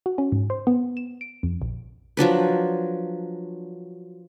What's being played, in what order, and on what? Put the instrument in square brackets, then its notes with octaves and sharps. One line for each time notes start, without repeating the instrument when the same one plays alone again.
[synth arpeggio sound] F#4
C#4
G#2
C5
B3
E7
D7
F2
A#1
[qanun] F3 F#3 D4 B4